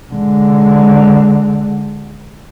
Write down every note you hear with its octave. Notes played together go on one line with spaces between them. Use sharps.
D3 G#3